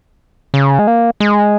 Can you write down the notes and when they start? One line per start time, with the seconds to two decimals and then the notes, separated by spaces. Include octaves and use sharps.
0.54 C#3
0.79 G#3
0.87 A#3
1.20 G#3